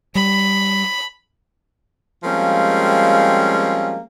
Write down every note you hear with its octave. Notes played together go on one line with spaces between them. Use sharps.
G3 B5
F3 G3 G#3 A#3 C4 C#4